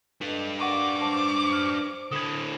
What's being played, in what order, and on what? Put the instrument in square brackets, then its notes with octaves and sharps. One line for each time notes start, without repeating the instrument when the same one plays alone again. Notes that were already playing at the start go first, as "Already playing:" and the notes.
[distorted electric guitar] D4 B4 [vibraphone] A4 D#5
[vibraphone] A#4 D5 F5 [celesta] F#5 C#6 D#7 [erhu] D6
[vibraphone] C5 [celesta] A5
[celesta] F6
[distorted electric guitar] D3 E4 [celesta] D#6 G#6